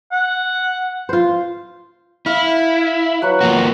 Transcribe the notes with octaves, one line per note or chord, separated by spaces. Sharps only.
F#5
F4 C5
E4 F5
F#3 B4 F#5
F3 A#3 F#4